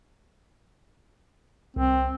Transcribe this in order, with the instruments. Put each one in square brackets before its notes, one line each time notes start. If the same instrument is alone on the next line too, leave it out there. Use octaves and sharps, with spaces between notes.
[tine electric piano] C2 [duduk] C4